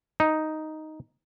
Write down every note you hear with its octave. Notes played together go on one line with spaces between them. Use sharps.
D#4